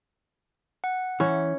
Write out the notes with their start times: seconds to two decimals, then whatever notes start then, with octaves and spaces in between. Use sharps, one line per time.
0.84 F#5
1.20 E3 C#4